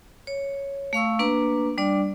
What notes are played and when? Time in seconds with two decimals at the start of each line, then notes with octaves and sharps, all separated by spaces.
0.27 C#5
0.93 A3 F5 C#6 E6
1.19 A#3 D4 B4 A#5
1.78 G3 D4 D5